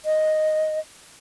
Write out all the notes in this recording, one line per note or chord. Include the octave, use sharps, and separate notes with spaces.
D#5